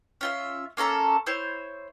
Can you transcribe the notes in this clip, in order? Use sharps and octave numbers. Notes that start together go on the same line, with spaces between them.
C#4 F4 E5
A#3 C#4 A4 A#5
E4 C5 C#5